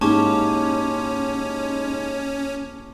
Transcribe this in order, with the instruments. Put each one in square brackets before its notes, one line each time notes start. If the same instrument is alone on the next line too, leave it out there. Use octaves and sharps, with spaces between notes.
[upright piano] G#2 [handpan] A#3 E4 G4 [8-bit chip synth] C#4 [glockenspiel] A5 C#6 D6